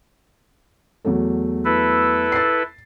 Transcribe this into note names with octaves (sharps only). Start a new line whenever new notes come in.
E2 F#3 A3
E4 A4 B4
A6 C7